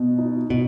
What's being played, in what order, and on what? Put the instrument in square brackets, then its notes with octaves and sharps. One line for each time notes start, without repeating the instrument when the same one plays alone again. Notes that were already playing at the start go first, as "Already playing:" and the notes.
Already playing: [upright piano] B2
D#4
[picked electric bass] B2 [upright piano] D#4